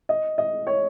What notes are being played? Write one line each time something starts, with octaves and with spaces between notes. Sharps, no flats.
D#5
D#5
C#5